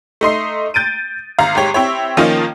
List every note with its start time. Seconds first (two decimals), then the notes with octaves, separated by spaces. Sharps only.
0.21 A3 D#4 C6 C7
0.74 G6 A6 D7 D#7
1.39 G#1 F5 A#5
1.55 G#1 G#2 G4 C#5
1.74 C4 E4 G4 C#5
2.17 D#3 F3 A#3 C#4 D#4 F4